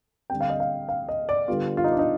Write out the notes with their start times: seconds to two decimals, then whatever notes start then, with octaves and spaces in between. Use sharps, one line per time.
0.30 D3 G3 C4 G5
0.41 F5
0.50 D#5
0.60 F5
0.89 F5
1.09 D#5
1.29 D5
1.48 D3 G3 B3 F4
1.77 F4
1.84 D#4
1.92 D4
1.99 D#4